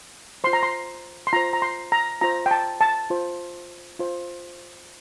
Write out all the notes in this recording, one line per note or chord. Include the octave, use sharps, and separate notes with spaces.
F4 C5 C6
A#5
C6
C6
F4 C5 A#5
A#5
C6
A#5
F4 C5 A#5
G5
A5
A5
F4 C5
F4 C5